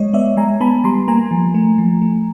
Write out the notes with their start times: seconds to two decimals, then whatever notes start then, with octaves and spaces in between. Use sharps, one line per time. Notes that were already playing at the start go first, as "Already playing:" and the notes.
Already playing: G#3 C#5 D#5
0.13 B3 D5 E5
0.37 G#3 G#5 A#5
0.61 B3 A5 B5
0.84 G3 A#5 C6
1.08 A#3 G#5 A#5
1.31 F3
1.54 A3
1.78 F3
2.02 A3